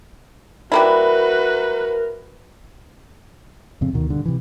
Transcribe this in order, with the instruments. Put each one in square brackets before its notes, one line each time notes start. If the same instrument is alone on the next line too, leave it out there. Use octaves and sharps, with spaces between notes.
[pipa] G3 A#3 E4 [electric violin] F#4 B4 [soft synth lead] A#4
[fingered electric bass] F2 C#3 C4
D2 B2 D#3
G2 D3
C3 E3